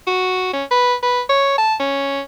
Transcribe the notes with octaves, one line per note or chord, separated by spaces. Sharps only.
F#4
C#4
B4
B4
C#5
A5
C#4